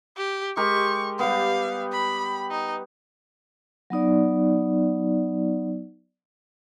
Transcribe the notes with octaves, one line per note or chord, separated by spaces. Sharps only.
G4
G#3 G4 A#4 C#6
G3 B3 F5
B5
D#4
F#3 B3 D#4 D5